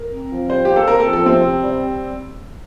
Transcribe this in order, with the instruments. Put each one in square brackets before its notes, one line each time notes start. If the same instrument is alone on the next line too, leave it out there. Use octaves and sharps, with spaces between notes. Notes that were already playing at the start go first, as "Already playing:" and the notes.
Already playing: [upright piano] A#4
[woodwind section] C4
F3
[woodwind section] G3 [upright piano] C5
[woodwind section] A#3 [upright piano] G4
[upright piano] A4
[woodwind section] C4 [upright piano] A#4
[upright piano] A4
[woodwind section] F3
[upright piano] A4
[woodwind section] C3 [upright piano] C4
[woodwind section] C3
G3